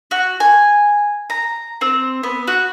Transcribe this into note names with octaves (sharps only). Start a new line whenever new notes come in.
F#4
G#5
A#5
C4
B3
F#4